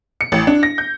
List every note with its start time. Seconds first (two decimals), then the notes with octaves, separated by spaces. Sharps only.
0.21 C#7
0.32 A1
0.47 D4
0.63 A#6
0.78 G6